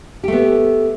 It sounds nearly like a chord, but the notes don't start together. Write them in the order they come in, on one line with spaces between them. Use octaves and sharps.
G4 A3 B3